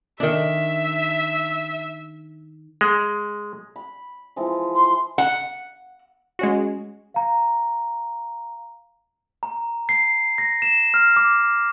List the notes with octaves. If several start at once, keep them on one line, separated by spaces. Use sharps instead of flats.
D#3 D4 E5
G#3
B5
E3 F3 G#3
C6
F#5
G#3 C#4 F#4
F5 A#5
A#5
C7
A#6
E7
F6
D6